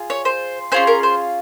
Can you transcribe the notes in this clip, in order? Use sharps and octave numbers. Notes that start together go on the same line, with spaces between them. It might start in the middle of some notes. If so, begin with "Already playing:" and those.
Already playing: F4 G#4
C#5
C5
C#4 F4 G#4 C5
A#4
C5